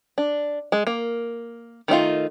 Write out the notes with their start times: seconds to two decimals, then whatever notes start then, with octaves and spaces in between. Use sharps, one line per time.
0.18 D4
0.72 G#3
0.87 A#3
1.88 D#3 A3 D#4 F4